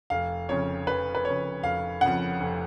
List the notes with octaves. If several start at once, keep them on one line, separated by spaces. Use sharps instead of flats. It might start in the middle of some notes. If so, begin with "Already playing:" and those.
F1 F5
F2 C#3 C#5
F1 B4
B4
F2 C#3 C#5
F1 F5
F2 C#3 F#5
F1